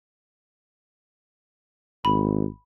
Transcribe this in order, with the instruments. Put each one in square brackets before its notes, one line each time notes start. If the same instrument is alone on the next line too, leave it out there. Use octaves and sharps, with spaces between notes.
[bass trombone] G#1 [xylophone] B5